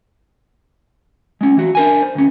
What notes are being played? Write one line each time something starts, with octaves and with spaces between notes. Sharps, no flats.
G#3 C#4
E3 F#4
D4 A#4 G#5
C5
D2 C#4